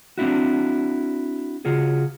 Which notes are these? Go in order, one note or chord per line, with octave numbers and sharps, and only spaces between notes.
C4 D4 E4 F#4
C#3 F4 F#4 G#4